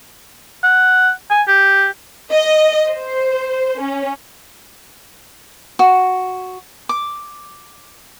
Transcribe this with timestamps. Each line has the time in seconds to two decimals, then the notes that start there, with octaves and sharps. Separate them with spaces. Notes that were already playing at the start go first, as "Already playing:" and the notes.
0.64 F#5
1.31 G#5
1.48 G4
2.31 D#5
2.90 C5
3.81 C#4
5.79 F#4
6.89 D6